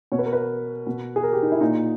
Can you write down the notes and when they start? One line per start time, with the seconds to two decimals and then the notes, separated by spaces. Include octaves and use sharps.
0.12 B2 C#5
0.19 B4
0.26 A#4
0.33 B4
0.87 B2
1.16 G#4
1.23 A#4
1.33 G4
1.43 D#4
1.52 E4
1.61 A#2 D#4